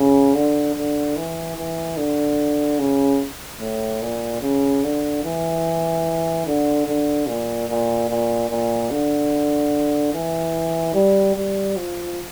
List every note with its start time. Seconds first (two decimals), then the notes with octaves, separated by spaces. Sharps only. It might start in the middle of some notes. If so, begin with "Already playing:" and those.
Already playing: C#3
0.34 D3
0.75 D3
1.16 E3
1.56 E3
1.97 D3
2.79 C#3
3.60 A2
4.02 A#2
4.41 C#3
4.83 D3
5.24 E3
6.46 D3
6.87 D3
7.28 A#2
7.69 A#2
8.09 A#2
8.50 A#2
8.91 D3
10.13 E3
10.94 G3
11.36 G3
11.76 F3